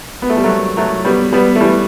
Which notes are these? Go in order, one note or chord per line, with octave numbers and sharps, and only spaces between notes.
B3
A3
G3
F#3 A3
F#3 A3
G3 B3
G3 B3
A3
E3 G3